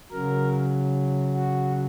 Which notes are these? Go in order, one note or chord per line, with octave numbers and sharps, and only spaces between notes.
C#3 F#3 A#4
F#4